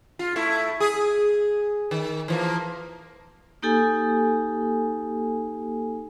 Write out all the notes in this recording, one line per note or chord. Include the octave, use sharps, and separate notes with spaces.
F4
A3 E4
G#4
D#3
E3 F3 A#3
A#3 D#4 G4 A4 G#5